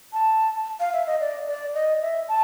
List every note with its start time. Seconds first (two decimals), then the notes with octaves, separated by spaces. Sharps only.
0.13 A5
0.80 F5
0.93 E5
1.07 D#5
1.20 D5
1.48 D5
1.75 D#5
2.02 E5
2.29 A5